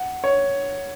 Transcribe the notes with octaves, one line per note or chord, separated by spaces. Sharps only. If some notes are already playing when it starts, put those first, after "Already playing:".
Already playing: F#5
C#5